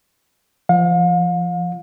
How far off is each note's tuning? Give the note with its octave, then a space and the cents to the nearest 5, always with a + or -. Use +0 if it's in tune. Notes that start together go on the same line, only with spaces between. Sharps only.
F3 -25 F5 +40